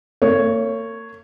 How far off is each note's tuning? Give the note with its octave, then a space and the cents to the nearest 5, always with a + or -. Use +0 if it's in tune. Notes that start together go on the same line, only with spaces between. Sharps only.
A#3 -40 C#5 +0